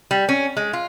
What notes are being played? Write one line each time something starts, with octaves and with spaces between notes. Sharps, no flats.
G3
C#4
G#3
F4